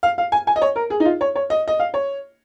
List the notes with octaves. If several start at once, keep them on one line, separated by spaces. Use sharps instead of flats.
F5
F5
G#5
G#5
D#5
C#5
A#4
G#4
D#4
F4
C#5
C#5
D#5
D#5
F5
C#5